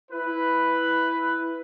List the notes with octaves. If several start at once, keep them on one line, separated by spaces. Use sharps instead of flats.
E4 B4